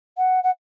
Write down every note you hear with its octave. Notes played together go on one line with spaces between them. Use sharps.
F#5
F#5